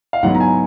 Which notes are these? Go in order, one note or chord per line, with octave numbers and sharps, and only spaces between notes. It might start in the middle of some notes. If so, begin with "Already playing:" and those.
F5
G#2 F#3 B3 F#5
A#5
G#5